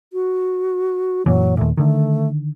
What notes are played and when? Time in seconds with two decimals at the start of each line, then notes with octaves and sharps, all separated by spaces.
0.13 F#4
1.26 F#2 A#2 E3 F#3
1.57 D#2 A#2 A3
1.77 D3 D#3 A3